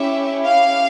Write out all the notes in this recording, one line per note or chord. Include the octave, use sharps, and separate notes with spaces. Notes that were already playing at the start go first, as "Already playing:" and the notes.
Already playing: C#4 E4 G4 E5
F5